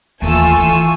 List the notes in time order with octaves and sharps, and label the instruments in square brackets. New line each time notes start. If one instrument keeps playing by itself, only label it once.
[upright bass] D#2 E3 [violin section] A3 F4 E6 [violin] G#5 C#6
[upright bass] E3